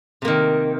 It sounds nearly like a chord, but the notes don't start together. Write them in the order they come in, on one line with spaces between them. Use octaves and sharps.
C3 A#3 D#3